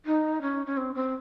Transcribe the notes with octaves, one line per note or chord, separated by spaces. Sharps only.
D#4
C#4
C#4
C4
C4